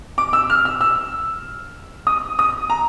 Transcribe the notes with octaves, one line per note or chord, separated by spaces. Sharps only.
D6
E6
F6
E6
E6
D#6
D#6
A#5